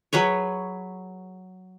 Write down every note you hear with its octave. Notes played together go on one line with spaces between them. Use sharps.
F#3 G#4 B4 C#5